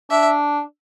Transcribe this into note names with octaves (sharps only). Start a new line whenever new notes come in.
D4 E5